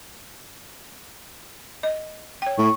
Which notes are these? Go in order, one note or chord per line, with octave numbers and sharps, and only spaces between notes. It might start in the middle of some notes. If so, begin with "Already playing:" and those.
D#5
C#5 G5
A2 C#6